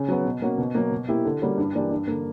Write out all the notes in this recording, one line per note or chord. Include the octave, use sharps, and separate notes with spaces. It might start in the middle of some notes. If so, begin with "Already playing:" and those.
Already playing: C#3
F#3 B3
B2
A#3 C#4 F#4
B2
F#3 A#3
B2
A#3 E4 G4
D3
G3 A#3 C#4 F#4
G2
E3 A#3 D4 G4
G2
D3 A#3